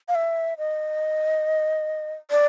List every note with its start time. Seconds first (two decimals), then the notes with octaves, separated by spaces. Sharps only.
0.08 F5
0.15 E5
0.58 D#5
2.31 D5